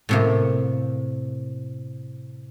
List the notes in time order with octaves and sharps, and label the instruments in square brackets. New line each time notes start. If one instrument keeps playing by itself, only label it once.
[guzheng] A2 C3 A#3